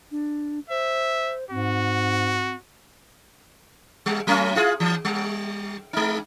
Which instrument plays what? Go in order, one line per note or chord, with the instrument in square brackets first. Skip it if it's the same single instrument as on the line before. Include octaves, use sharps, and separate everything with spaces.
[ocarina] D4
[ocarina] C5 [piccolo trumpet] E5
[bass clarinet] G#2 [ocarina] C4 [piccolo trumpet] F#4
[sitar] G3 G#3
F#3 A3 C#4
E4 F4 G#4
E3
G3
G#3 D#4